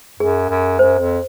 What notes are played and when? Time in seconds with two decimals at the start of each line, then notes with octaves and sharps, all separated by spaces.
0.20 F#2 G#4
0.50 F#2
0.79 F#2 C5
0.99 F2